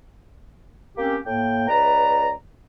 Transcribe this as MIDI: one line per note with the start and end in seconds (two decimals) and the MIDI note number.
0.97 1.17 58
0.97 1.17 60
0.97 1.17 61
0.97 1.17 67
1.26 1.67 45
1.26 1.67 58
1.26 1.67 79
1.68 2.31 37
1.68 2.31 71
1.68 2.31 74
1.68 2.31 82